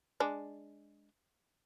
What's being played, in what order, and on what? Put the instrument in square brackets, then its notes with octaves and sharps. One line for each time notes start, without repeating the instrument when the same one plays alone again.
[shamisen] G#3 D4